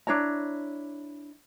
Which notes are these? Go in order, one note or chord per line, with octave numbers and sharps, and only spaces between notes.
D4 E4 C#5 A#5